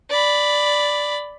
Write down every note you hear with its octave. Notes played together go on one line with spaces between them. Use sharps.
D5 B5